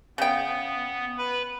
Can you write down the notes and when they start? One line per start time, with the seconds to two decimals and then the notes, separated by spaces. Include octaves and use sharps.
0.18 C#3 B3 G5
1.18 B4 B5